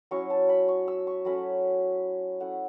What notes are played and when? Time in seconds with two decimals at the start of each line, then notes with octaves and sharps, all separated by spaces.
0.11 F#3 C#4 E4 C#6
0.30 A5
0.49 B5
0.68 C#6
0.88 E6
1.07 C#6
1.25 F#3 A3 C#4 B5
2.40 A3 C#4 E4 F#5